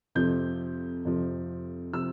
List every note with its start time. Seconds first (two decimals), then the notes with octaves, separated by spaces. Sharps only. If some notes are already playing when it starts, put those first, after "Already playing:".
0.15 F2 C3 F3 G6
1.05 F2 C3 F3
1.93 C3 F3 E6